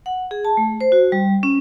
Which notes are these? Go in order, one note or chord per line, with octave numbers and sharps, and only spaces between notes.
F#5
G#4
A5
A3
C5
F#4
G3
C#4